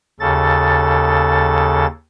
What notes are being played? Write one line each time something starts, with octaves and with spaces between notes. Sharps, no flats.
D#2 C#3 A4 A6